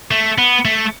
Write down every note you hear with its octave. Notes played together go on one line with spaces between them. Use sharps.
A3
B3
A3